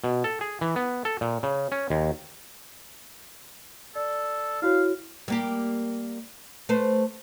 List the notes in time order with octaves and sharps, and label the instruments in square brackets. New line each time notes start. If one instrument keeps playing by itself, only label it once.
[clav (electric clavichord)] B2
A4
G#4
E3
B3
A4
A#2
C#3
C#4
D#2
[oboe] A4 [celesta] D5
[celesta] E4 F#4 C#5 [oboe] F5
[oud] G3 A#3 G4
A3 B4 C5